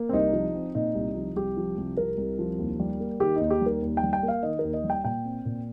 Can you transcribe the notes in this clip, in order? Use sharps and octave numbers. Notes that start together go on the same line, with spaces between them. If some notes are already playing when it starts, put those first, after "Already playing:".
Already playing: A#3
C4
C2 D#4
F3
C4
A#2 D#4
C2
F3
C2 G4
F3
C2
C3 A#4
C2
F3
D#2
G3
A#3
D#3 G4
D#2 D#4
G4
G3
A#4
D#2
G5
G3
G5
A#3
F5
D#3 D#5
A#4
D#2
D#5
G3
G5
A#2 G5
C4
A#2